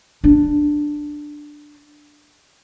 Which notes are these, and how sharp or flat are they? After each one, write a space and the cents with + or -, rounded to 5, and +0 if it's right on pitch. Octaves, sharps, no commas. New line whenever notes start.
D4 +10